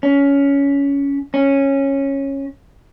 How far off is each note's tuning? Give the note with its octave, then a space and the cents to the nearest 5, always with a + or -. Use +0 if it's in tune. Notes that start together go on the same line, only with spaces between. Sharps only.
C#4 +15
C#4 -10